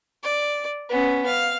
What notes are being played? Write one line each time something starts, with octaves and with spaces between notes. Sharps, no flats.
D5
B3 C#4
F5